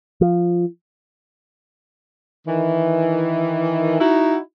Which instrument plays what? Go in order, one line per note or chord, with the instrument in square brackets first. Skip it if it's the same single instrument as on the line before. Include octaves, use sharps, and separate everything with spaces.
[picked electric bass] F3
[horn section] D#3 E3
D#4 E4 F#4